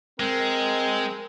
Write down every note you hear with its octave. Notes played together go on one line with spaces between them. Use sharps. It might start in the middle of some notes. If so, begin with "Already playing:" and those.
G#3 C4 A#4